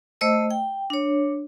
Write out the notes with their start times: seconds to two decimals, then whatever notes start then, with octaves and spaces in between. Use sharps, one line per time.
0.21 A3 C5 D#5 E6
0.51 G5
0.90 D4 C#5